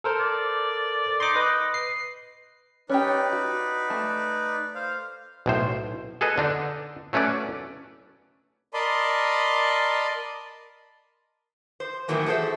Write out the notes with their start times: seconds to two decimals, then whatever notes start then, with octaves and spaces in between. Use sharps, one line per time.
0.04 A4 A#4 C5
0.20 D5
1.20 D#4 C6 D6
1.36 B4 D#5
1.74 C7
2.90 C#4 D#4 G4 B4 D5
3.33 F#4
3.90 A3 A5
4.75 C5 F5
5.46 B1 A2 C5
6.21 G#4 A4 B4 D#5
6.38 D3 D4 D#4
7.13 F#3 A3 C#4 B4 D5
8.74 A#4 D5 D#5 A5 B5 C6
11.80 C5
12.08 A2 D#3 E3 F#3 A#3 B3
12.26 F#4 G#4 A4 B4 C5 E5